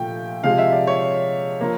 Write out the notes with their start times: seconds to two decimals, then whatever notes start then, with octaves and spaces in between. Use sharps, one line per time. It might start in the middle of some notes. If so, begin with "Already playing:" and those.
Already playing: A#2 F3 A3 G5
0.43 C3 F3 G#3 F5
0.58 E5
0.72 D5
0.87 C#5
1.61 F3 A#3